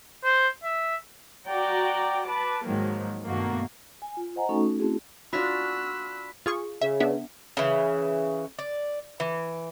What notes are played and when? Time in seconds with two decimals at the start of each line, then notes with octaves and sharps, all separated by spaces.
0.24 C5
0.64 E5
1.48 F#4 D5 F#5 G5 A#5
2.25 B4 A5 D6
2.65 G#2 D#3 F3 F#3 G#3 A#3
3.26 G2 B2 D#3 A3 A#3 F#4
4.02 G#5
4.17 F4
4.36 C5 D#5 F#5 G#5 A#5
4.49 A3 C#4 D#4 F#4 A4 C#6
4.79 A3 C4 C#4 E4 F#4 G#4
5.33 D4 F4 F#4 B5 E6 F#6 B6
6.46 F4 G#4 C#6
6.81 C#3 E5
7.00 B3 D4 E5
7.57 C#3 E3
8.59 D5
9.20 E3